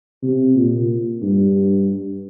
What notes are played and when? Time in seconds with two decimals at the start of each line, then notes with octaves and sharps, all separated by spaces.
0.23 C3
0.55 A#2
1.22 G2